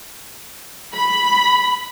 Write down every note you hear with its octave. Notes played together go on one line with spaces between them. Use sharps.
B5